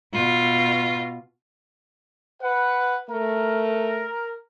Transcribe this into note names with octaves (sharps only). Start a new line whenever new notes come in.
B2 F4
B4 F#5
A3 A#4